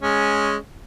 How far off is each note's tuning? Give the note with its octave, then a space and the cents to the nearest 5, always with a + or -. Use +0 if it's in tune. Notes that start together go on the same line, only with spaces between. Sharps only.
G#3 +0 C#4 +0